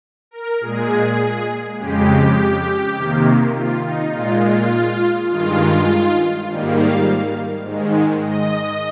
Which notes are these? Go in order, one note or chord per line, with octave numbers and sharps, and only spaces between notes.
A#4
A#2 G#3 G#4
F2 C#3 G#3 G4
C3 D#3 A#3
F4
D#4
A#2 G#3 F4
F4
G2 D#3 G#3 F4
G#2 D#3 G3 A#3
F5
G#2 D#3 G#3
D#5